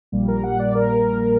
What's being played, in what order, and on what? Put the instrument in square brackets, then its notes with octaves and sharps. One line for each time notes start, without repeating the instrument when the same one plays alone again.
[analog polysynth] A#1 A#2 G3 A#3
A#4
F#5
D5
A#4